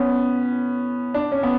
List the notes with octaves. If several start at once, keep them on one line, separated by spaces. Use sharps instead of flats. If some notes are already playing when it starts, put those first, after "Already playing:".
Already playing: B3 C#4
D4
C#4
B3